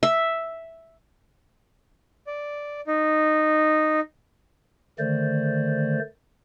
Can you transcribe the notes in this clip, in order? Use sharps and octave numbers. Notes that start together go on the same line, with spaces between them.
E5
D5
D#4
D3 D#3 A3 C5 D5